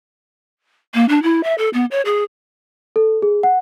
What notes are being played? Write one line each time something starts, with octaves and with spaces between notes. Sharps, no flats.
A#3
D4
E4
E5
A4
B3
C#5
G#4
A4
G#4
F#5